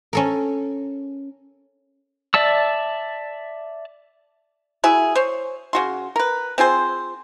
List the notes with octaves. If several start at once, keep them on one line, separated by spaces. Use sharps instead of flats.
C#4 A4 A#4
D5 E5 A5 E6
F#3 E4 G#4
C5 C#5
C#3 F#4 C6
A#4 B4
C4 F4 G#4 C5